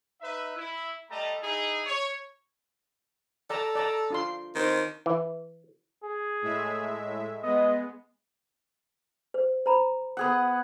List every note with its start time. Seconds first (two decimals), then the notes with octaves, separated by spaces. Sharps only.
0.21 D#4 B4 E5
0.55 E4
1.09 G3 A3 D#5 A5 A#5
1.42 D#4 E4 G#4
1.86 C#5
3.50 A4 D5 A5 A#5
3.75 D5 A5 A#5
4.10 D4 F4 C6
4.55 D#3 C4
5.06 E3
6.04 G#4
6.42 A2 G#3 E5
7.43 G#3 B3 D#5
9.34 C5
9.66 C5 A#5 B5
10.17 B3 G#4 F#5